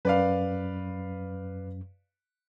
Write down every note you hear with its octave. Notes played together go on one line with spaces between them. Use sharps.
F#2 B4 D5 F5